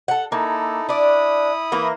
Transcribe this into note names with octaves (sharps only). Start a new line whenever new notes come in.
A4 F#5
A#3 D#4 E4 A4
D4 E4 D5 B5 D#6
E3 A#3 A#4